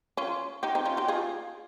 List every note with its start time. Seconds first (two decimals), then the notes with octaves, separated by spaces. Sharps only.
0.17 C#4 F4
0.63 D#4 G4
0.75 C4 D#4
0.85 C#4 F4
0.97 D#4 G4
1.08 F4 G#4